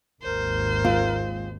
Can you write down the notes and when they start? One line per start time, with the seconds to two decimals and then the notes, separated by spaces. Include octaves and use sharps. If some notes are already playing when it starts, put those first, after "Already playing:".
0.23 G#1 D#2 A#4 C5
0.85 G#3 C4 F4